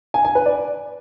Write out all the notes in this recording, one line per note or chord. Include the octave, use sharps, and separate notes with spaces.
G#5
G#5
B4
D5